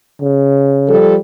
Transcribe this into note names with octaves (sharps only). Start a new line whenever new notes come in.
C#3
F3 G3 A4